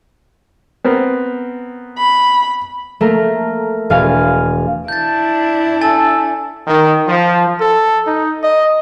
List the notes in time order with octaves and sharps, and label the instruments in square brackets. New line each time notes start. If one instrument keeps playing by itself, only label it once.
[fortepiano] B3 C4 A#4
[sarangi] B5
[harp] A3 A#3 A#4
E1 F5 G#5
[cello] D4 E4 [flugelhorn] A5 [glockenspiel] G6 A6
[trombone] A4 [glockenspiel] G#5 A6
[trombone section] D#3
F3
[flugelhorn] A4
D#4
D#5